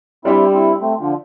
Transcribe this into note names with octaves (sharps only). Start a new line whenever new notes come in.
G3 C4 D4 E4 G4
C4 E4
A3 C4
D3 F3